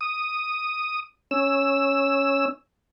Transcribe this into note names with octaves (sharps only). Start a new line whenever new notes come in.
D#6
C#4 E6